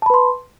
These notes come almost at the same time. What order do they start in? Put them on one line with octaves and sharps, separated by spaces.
A5 B5 B4 C6